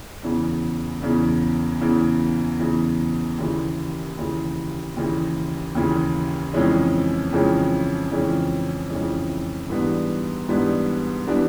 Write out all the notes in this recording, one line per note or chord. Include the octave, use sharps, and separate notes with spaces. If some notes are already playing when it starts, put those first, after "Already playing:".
E2 C#3 E3
E2 C#3 E3
E2 C#3 E3
E2 C#3 E3
D#2 C#3 E3
D#2 C#3 E3
D#2 C#3 E3
D#2 C#3 E3
F2 C#3 E3 G#3 C#4
F2 C#3 E3 G#3 C#4
F2 C#3 E3 G#3 C#4
F2 C#3 E3 G#3 C#4
G#2 E3 G3 B3 D4
G#2 E3 G3 B3 D4
E3 G3 B3 D4